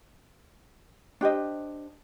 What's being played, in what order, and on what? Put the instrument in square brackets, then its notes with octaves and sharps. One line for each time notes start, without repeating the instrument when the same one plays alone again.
[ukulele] D4 G4 C5 D#5